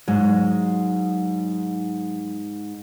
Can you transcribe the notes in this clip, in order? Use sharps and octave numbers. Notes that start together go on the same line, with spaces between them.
G#2 F#3